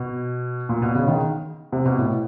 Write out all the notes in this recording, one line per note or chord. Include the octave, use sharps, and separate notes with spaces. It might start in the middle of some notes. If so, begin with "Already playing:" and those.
Already playing: B2
A#2
B2
C#3
D#3
C3
B2
A2